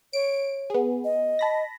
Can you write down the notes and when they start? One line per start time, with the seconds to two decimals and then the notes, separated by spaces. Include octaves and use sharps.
0.13 C#5 D7
0.70 B3 G#4
1.04 D#5
1.39 A5 B5 A#6